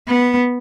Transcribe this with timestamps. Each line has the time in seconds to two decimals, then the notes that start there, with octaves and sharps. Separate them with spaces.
0.09 B3